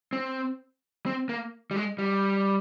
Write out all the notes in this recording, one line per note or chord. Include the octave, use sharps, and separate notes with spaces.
C4
C4
A#3
G3
G#3
G3